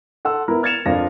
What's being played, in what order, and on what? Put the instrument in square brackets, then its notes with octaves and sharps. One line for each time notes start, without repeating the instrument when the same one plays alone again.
[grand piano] A4 F#5 C6 E6
B3 E4 A#4
F6 G#6 A6 C#7 E7 F7
F2 F3 D4 F4 A#4 A#6